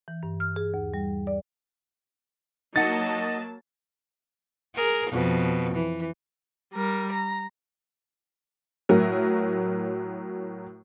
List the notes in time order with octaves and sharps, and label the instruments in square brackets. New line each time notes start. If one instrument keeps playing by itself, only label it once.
[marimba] E3
G2
F6
G#4
D#2
G3
D5
[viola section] F#3 A#3 A5 [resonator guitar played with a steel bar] D#4 F#5 [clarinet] D#5 [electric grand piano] A6
[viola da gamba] G#4 A#4
F2 B2
E3
[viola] G3 A#4
A#5
[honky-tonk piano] A2 F#3 A#4